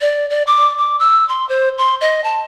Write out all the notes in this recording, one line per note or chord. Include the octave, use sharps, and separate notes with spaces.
D5
D5
D6
D6
E6
C6
C5
C6
D#5
A5